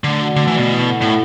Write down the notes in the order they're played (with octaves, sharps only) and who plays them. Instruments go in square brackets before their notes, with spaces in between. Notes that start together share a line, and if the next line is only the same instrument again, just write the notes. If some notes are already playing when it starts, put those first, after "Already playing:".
[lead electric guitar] D3 [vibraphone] A3
[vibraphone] F#4 D5 F#5
[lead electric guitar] D3 [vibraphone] A3
[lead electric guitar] E3
[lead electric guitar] B2 [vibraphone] F#4 D5 F#5
[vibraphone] E4
A4 F#5
[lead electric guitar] A2 [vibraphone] E4